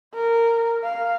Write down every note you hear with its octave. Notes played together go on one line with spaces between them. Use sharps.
A#4
F5